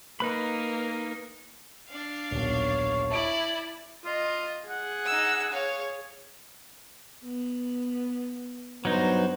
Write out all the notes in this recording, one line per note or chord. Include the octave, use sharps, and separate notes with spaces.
A#3 D#4 B4 B5
D4 F5
D#1 B1 C#5
E4 D5 A5 D7
F4 D#5
G#4 F#5
D#4 E6
C#5 F5
B3
G2 F#3 B3 D#4 C5